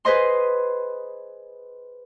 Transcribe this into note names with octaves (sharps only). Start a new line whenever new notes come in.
G#4 B4 C5 D#5 C6